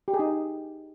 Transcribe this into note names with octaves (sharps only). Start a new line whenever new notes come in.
G4
G#4
D#4